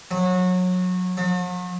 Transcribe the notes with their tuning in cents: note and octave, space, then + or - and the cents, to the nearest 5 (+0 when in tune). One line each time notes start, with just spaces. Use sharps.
F#3 -25
F#3 -45